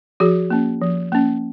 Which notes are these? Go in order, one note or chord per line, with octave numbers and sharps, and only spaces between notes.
F3 F#4 G#4
A#3 C#4
F3
A#3 C#4